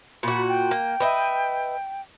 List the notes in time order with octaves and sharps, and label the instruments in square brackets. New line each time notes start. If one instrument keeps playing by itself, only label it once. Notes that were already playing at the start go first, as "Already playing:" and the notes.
[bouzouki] A#2 F#4 [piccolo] B5
[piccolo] G5
[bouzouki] A#3
B4 D#5 E5